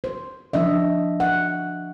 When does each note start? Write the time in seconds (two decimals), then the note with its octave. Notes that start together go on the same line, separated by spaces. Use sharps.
0.04 C5
0.53 F3 D4 D#5 E5
1.20 F#5